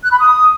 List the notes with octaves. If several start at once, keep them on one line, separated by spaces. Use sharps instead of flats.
F#6
B5
D#6